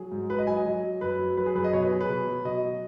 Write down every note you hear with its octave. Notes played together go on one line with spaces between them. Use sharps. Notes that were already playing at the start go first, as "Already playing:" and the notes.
Already playing: F#3 G#4
G#2
F#3 B4
D#5
F#3 G#5
D#5
F#3
F#3
F#2 B4
F#3
F#3 B4
G#4
F#2 B4
D#5
B2 C#5
B4
F#3 G#4
B4
B2
F#3
B2 D#5
F#3